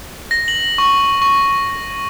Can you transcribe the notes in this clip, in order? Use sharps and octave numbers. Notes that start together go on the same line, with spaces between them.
A#6
F#7
C#6
C#6